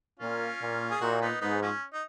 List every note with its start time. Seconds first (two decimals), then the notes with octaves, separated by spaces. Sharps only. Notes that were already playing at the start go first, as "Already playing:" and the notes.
0.19 A#2 C#4 F4
0.60 A#2
0.91 G#4
1.01 A#2 D#4 F#4
1.21 B3 D#4
1.41 G#2 B3 D#4
1.62 F3 G#3 C#4
1.93 D#4